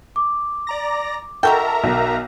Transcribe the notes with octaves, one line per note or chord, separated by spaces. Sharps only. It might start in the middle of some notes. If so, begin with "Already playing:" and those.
D6
D5 A#5 A#6
D#4 F#4 A4 A#4 E5 G5 A#5
B1